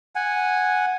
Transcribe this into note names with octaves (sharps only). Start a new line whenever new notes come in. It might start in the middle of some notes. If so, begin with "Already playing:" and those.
F#5 G#5